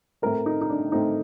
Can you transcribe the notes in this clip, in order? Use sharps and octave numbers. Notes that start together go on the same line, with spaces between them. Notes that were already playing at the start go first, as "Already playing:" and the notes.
A2 A3 C4 A#4
D#4
D#4
D4
A2 A3 C4 D#4